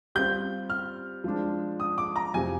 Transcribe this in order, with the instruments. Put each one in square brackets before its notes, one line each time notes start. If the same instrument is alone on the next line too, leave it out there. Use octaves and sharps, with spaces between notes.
[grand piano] G3 C4 F4 [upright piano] G6
[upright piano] F6
[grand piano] F3 G#3 D4
[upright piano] D#6
D6
A#5
[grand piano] F2 C3 F3 [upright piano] G#5